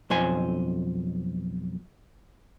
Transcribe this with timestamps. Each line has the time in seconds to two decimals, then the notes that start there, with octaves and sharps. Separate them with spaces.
0.10 B1 F2 C5 G#5